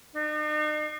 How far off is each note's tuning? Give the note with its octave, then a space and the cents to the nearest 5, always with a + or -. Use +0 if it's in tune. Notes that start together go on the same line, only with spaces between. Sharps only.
D#4 -45